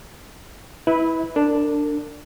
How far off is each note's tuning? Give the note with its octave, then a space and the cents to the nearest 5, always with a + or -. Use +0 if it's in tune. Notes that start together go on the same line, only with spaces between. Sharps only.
E4 -15 B4 +0 E5 -40
D4 +0 A#4 -40